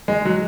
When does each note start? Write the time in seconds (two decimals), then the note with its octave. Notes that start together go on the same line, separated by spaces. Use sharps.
0.08 G#3
0.25 F#3